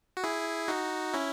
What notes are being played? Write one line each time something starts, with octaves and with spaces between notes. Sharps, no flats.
F#4
E4 G#4
D#4 F#4
C#4 E4